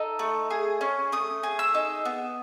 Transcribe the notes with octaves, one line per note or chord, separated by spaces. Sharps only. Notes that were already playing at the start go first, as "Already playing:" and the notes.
Already playing: D#4 A4
A3
G#4
C#4
A3 D#6
G#4
E6
D#4
B3